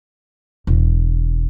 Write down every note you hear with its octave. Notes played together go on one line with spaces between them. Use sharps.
E1